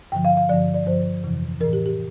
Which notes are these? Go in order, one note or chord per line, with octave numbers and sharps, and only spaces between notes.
G2 D3 F3 G5
F5
F5
G2 D3 F3 D5
D5
G2 F3 C5
F2 C3 E3
A2 E3 A#4
G4
G4